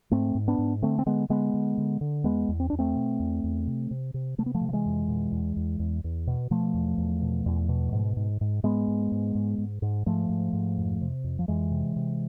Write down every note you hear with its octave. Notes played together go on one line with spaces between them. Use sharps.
G#2 A3 C4
G#2
B3 D4
G#2
D3 A3 C4
C4
D3 G#3 B3
D3 G#3 B3
D3
D3
D3
E2 G#3 B3
E2
C4
E2 D4
A3 C4
B2
E2
E2
C3
C3
C3
C3 A3
B3
F3 A3
C3
F3
E3 G#3
F2
B2
E2
E2
E2
E2
B2
B2 F3 A3
E2
E2
B2
E2
B2
G#2
G#2
G#2
G#2 G#3 B3
G#2
G#2
G#2
G#2
G#2
G#2 F3 A3
G#2
G#2
F2
C3
F2
F3
F2 E3 G#3
C3
C3